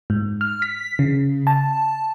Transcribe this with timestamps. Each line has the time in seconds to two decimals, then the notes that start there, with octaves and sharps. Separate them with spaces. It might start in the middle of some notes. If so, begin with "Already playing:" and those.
0.10 G#2
0.41 F6
0.62 B6
0.99 C#3
1.47 A5